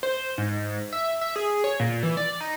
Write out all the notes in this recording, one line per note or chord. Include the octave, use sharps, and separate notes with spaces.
C5
G#2
E5
E5
G#4
C#5
A#2
E3
D5
D#4